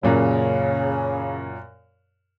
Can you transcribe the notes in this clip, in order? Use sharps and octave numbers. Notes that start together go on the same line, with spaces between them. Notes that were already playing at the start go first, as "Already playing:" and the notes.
F#2 A#2 C#3 F#3